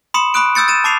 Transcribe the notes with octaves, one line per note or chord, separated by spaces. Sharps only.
B5 C6 D#6 C#7 E7
B5 C#6 D#6 F#6 D7
D#6 E6 G6 A6 C#7
A6 D#7 E7
A5 D6 C7 F7